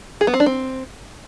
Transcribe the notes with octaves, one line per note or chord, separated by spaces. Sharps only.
G#4
B3
C4
D4
C4